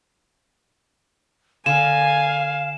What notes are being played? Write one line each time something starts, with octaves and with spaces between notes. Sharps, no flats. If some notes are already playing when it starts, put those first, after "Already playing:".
D3 F5 G#5 E7